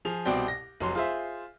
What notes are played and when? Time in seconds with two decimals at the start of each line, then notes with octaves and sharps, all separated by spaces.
0.05 F3 G#4 F7
0.25 C2 B2 C4 D5 G5
0.48 A#6
0.80 F1 F#3 C6
0.95 F4 G#4 C5 E5